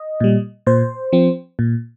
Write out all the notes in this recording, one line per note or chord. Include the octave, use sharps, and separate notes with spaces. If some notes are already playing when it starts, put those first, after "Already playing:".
Already playing: D#5
A#2 G3
A#2 C5
F3 C4
A#2